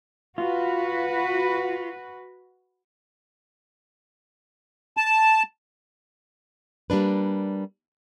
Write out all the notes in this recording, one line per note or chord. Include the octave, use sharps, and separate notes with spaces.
F4 F#4 B4
A5
G3 A#3 D4 B4